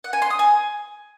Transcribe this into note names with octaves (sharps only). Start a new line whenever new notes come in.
F#5
G#5
C6
D#6
G#5